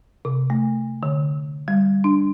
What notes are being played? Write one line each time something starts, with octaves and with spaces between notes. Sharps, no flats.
C3
A3
D3
G3
D4